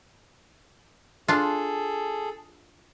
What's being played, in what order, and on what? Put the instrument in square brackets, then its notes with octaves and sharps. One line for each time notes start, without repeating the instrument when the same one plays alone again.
[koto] D4 F4 [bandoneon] G#4 A4